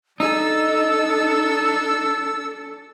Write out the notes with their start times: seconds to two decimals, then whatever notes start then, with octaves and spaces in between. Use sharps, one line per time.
0.20 D4 D#4 A4 E6